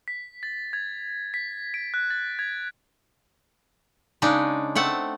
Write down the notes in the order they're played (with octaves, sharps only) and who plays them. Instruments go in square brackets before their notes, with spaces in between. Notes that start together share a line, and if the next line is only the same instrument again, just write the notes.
[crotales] B6
A6
G#6
B6
D7
F#6
A6
G#6
[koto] C#3 G#3 D4 D#4
A3 C4 F#5 A5